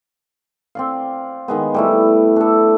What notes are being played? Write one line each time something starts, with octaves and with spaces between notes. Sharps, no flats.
C4 D5 F5
D#3 G#3 B3
G3 A3 E4
D4 A4